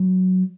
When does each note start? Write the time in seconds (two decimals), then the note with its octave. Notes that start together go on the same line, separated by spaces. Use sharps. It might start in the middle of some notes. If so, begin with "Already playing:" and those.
Already playing: F#3